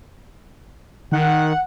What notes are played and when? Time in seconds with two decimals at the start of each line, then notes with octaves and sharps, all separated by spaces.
1.12 D#3 F#5